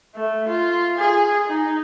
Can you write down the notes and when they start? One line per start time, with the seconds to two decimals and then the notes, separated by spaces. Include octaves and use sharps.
0.16 A3
0.49 F4
0.98 G#4
1.49 D#4